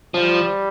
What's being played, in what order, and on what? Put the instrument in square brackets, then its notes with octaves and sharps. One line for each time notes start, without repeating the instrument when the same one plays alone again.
[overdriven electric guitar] F3 [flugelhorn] G3